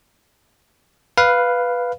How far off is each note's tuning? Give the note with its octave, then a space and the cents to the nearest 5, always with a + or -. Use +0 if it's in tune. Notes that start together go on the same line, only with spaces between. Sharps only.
B4 +0 F5 +0